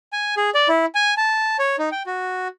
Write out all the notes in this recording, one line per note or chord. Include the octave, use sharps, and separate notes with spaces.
G#5
G#4
D5
E4
G#5
A5
C#5
D#4
G5
F#4